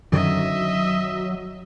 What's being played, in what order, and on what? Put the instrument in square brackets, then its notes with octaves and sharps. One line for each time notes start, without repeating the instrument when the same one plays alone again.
[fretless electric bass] F#2 D3 D#3 [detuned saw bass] F#3 [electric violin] D#5 E5